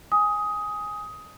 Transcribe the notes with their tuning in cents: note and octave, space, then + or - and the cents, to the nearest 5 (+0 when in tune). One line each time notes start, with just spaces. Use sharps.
G#5 -5 D#6 +15